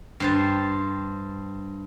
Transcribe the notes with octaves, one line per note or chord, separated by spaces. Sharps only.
G2 C5 A5